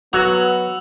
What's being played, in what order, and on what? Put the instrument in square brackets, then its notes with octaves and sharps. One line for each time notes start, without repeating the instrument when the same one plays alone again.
[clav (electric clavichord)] F#3 [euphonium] B3 [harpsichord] F#4 [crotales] E6 F7